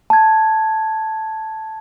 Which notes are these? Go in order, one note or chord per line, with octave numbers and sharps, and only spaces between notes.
A5 G#6